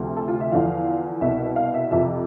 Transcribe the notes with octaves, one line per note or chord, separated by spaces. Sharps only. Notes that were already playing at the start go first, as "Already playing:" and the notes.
Already playing: D2 C3 F3
A4
F4
E5
E2 D3 F3 F5
C2 B2 E5
F5
E5
F2 C3 F3 E5